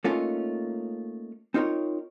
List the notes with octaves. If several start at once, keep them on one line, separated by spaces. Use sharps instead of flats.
A3 A#3 C#4 D#4 F4
C4 D#4 F4 A#4 C#5